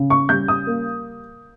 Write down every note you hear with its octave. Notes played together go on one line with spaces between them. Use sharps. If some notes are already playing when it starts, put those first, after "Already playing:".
Already playing: C#3
C#6
G3 G6
D#6
A#3